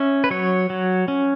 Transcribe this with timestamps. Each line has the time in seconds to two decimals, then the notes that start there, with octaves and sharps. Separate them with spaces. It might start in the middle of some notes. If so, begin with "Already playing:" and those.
Already playing: C#4 E5
0.24 B4
0.30 F#3 C#5
0.70 F#3
1.08 C#4